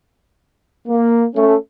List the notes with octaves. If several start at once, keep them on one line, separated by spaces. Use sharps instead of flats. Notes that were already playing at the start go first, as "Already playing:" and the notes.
A#3
A3 C#4